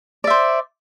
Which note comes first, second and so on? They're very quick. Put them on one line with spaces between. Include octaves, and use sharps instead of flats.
D5 E5 C5